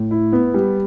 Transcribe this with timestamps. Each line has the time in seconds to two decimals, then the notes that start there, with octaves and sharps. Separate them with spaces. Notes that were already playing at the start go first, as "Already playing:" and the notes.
Already playing: A2
0.11 E4
0.33 B3
0.54 G3